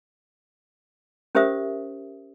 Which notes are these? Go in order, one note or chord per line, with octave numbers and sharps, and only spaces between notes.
C#4 G4 A#4 C5 E5 D#6